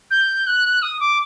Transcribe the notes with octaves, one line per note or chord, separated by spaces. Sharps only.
G6
F#6
D#6
D6